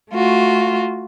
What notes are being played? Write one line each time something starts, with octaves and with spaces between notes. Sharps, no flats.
A3 F4 F#4